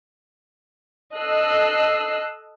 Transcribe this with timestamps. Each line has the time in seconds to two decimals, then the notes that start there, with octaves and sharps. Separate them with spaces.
1.16 A4 D#5 E6 F#6 C7